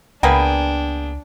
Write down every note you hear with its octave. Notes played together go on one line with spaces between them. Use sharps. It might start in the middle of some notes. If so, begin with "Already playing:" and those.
C#2 A#3 B3 D4 G#4 G5